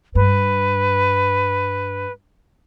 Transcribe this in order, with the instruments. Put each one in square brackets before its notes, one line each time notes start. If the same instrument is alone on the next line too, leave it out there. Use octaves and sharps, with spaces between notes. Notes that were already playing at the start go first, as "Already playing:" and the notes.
[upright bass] G2 [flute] B4